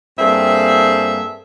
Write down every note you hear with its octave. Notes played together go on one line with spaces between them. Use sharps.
G2 A#3 C4 G#4 A4 E5